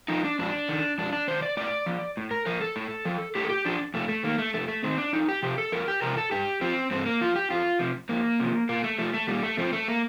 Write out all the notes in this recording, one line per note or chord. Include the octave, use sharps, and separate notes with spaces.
F3 D#4
D4
F2 D4
D#3
F2 D4
D4
D#3 C5
D5
A2 D5
F3
A2
A#4
F3 A#4
A4
A2
F3
A2 G4
A4
G4
F3 D4
F2 A3
A3
D#3 A#3
A3
F2 A3
A3
D#3 C4
D4
F2 D#4
G4
C3 F3 G4
A4
F2 A#4
G4
C3 F3 A#4
A4
G2 G4
F3 C4
G2 C4
A#3
F3 F4
G4
F2 F4
C3 F3
F2 A#3
C3 F3
A#2 A#3
A3
F3 A3
A3
A#2 G3
A3
F3 C4
A3
A#3